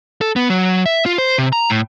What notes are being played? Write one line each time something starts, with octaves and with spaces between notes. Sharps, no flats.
A4
B3
F#3
E5
F4
C5
C3
A#5
A2